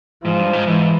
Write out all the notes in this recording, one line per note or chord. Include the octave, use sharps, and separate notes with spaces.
G#2 F3
G2
G#2
G#2 E3